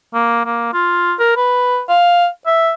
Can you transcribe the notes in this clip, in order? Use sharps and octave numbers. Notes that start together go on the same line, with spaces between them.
A#3
A#3
F4
A#4
B4
F5
E5